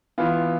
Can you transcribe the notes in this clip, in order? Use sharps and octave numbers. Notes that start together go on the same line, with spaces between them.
E3 B3 F4